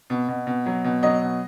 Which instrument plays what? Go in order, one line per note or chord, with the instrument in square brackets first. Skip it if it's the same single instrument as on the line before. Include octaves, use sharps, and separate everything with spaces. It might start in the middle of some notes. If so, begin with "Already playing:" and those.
[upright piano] B2
B2
B2
F#3
B2
F#3 D#5
B2